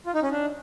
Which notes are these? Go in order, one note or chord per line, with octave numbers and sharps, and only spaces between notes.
F4
D#4
C#4
D4